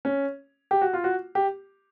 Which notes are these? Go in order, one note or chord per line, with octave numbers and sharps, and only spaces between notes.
C#4
G4
F#4
F4
F#4
G4